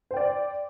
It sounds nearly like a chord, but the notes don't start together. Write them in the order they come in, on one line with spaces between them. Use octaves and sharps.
C5 G5 D5